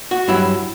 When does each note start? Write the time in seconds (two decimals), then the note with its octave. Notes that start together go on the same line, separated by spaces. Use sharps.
0.11 F#4
0.28 G2 F#3 E4